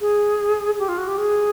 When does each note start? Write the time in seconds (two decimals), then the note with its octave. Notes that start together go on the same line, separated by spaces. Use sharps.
0.01 G#4
0.79 G4
0.89 F4
0.98 F#4
1.08 G4
1.18 G#4